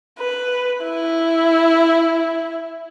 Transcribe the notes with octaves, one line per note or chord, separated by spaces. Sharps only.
B4
E4